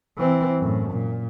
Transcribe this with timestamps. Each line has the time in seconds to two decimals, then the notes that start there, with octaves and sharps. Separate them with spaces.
0.18 E3 C4
0.58 F#2 A2
0.91 A#2